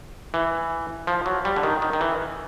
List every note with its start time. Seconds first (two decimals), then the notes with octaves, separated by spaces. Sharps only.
0.34 E3
1.07 F3
1.26 F#3
1.45 G3
1.56 D3
1.63 D#3
1.82 D#3
1.93 D#3
2.01 E3